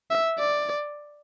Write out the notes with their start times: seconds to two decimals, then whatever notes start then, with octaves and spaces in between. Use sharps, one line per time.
0.11 E5
0.38 D5